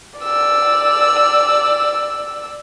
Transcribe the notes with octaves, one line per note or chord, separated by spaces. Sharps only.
D5 E6